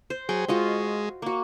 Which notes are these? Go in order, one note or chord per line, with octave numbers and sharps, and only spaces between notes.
C5
F#3 G#4 G5
G#3 F4 F#4 D#5
A#3 F#4